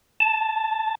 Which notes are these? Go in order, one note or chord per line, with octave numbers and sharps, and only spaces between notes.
A5